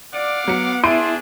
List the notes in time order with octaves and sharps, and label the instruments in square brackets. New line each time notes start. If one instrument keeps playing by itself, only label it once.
[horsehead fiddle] D5 [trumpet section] F5 F#5 D6
[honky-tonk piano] F#3 C#7 [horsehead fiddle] B3
[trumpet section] A3 D4 G#4 [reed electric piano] E4 E5 [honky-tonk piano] C6 D7 D#7